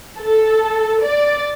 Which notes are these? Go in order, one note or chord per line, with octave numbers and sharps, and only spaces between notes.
A4
D5